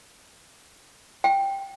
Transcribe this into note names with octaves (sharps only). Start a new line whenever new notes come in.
G5